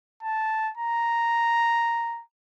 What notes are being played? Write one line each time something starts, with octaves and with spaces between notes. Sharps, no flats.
A5
A#5